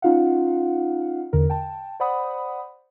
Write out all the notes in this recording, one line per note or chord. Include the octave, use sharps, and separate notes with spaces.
C#4 D#4 F4 F5 F#5
E2 D3 A#4
G5 A5
C5 D5 F#5 B5 D#6